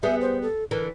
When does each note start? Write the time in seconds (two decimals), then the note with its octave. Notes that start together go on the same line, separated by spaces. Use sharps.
0.03 G3 B3 G#4 E5
0.21 C5
0.42 A4
0.71 D3 E3 A#4